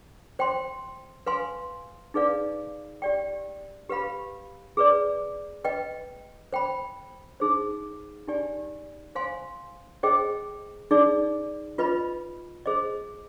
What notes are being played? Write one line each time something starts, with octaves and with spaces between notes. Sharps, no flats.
C5 G5 C6
B4 F5 G#5 C6
D#4 G#4 B4 D5 F5
G4 D5 G5
G4 B4 F5 B5
G#4 B4 D5
B4 D#5 G5
C5 G5 B5
D#4 G#4 C5
D#4 G4 D5 G#5
C5 F5 G#5 C6
G#4 C5 D#5 G5
D#4 G#4 D5
F4 B4 D#5 B5
G#4 C5 D#5